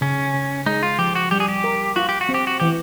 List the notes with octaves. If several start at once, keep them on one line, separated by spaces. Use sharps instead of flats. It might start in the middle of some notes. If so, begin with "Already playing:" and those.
C#3 C#4
C#3
G#3 D#4
F4
F3 G4
F#4
G3 G4
G#4
G4
A#4
F4 F#4
G4
F#4
C4
G4
F#4
E3 G4